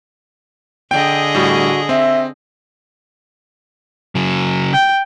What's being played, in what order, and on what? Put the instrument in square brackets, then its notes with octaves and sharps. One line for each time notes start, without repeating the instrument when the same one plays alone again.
[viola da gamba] D3 G#4 D#5 [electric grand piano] G5
[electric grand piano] A2 G3 [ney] F#4
[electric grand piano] C4 [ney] E5
[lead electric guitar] C#3 F#3
[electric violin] G5